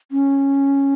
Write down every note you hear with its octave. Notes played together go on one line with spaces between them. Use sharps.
C#4